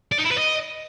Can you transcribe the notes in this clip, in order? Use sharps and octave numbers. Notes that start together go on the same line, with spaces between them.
D5
D#4
E4
B4
D#5